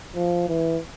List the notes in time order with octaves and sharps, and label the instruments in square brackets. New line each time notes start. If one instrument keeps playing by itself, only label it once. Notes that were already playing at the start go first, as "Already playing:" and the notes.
[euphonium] F3
E3